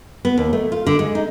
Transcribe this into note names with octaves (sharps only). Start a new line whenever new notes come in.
B3
D#2
A3
F4
D3
G#3
D#4